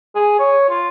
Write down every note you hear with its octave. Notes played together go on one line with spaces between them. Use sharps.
G#4
C#5
F4